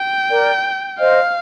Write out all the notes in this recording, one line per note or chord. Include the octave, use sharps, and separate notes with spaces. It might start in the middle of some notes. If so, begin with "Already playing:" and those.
Already playing: G5
A#4 D5
C5 D#5 F5